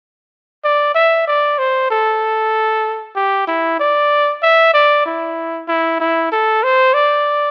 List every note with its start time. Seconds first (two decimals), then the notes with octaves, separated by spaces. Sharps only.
0.64 D5
0.95 E5
1.27 D5
1.59 C5
1.90 A4
3.15 G4
3.47 E4
3.80 D5
4.43 E5
4.74 D5
5.06 E4
5.68 E4
6.00 E4
6.32 A4
6.63 C5
6.94 D5